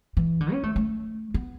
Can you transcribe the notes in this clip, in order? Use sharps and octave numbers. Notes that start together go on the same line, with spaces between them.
E3
D3
C#4
A3
A3
B3